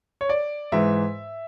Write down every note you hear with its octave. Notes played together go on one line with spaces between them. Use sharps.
C#5
D5
G#2 E3 E5